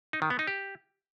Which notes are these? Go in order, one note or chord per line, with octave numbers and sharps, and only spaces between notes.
D#4
D#3
B3
D#4
G4